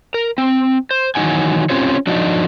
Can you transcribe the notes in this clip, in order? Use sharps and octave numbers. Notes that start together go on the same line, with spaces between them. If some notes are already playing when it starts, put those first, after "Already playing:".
A#4
C4
C5
D#3 E3 F#3 D#4 F#5 G#5
C4 C#4 F4 G4 C5 C#5
F3 F#3 D4 D#4 F#4 D#5